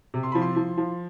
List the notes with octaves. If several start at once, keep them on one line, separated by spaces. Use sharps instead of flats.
C3
C6
F3 B5
C6
F3
F3